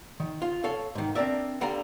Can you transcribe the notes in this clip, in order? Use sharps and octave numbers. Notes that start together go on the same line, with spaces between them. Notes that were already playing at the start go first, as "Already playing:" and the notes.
D#3
F4
A4 C#5 F5
G#2 D#3
C4 D4 A#4 D5 E5
D3 G3 F5 G5 A#5